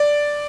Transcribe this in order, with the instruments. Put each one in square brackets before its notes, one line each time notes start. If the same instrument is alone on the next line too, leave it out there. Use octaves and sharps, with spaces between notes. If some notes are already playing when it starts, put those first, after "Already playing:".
Already playing: [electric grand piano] D5